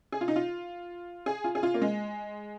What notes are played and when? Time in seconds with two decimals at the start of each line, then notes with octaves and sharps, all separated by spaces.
0.12 G#4
0.21 F4
0.28 D#4
0.36 F4
1.26 G#4
1.44 F4
1.55 G#4
1.63 F4
1.74 A#3
1.82 G#3